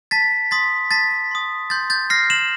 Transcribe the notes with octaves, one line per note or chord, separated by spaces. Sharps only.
A5 A6 B6
C6 D#6 A6 B6
A5 A6 B6
C6 D#6
C6 G6 A6
G6 A6
F6 A#6 C7
E7 F#7